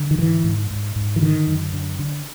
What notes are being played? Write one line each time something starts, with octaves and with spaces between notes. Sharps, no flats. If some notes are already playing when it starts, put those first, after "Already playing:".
Already playing: D3
D#3
G#2 E3
G#2
G#2
G#2
E3
D3 D#3
F#2
D3
D3